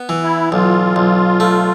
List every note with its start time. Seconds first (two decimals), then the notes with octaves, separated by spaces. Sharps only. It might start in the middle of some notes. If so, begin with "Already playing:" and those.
Already playing: B3
0.09 E3
0.23 E4
0.52 B1 F4
0.96 B1
1.40 A3